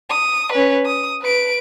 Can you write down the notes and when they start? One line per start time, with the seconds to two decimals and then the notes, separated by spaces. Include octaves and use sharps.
0.10 D#6
0.52 C#4 B4
0.85 D#6
1.21 B4 D7